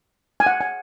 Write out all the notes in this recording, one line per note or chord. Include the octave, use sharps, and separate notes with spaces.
G#5
F#5
G#5